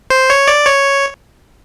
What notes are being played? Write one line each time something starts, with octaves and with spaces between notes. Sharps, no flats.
C5
C#5
D5
C#5